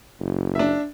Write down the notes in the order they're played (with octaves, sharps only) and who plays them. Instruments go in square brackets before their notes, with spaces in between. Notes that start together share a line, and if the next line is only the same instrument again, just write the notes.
[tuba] F#1
[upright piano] D4 E5